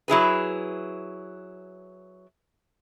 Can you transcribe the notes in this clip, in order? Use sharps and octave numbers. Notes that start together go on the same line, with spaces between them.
F#3 E4 G#4 B4